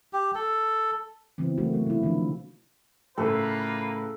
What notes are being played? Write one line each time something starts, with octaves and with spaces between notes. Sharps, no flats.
G4
A4
C#3 E3 B3 C4
E3 F#3 A3 A#3 F#4
E3 A3
C3 E4
D#3 F3 D4
A2 C#3 A#3 F4 A4 B4